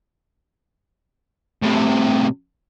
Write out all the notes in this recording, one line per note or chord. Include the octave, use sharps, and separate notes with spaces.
A2 C3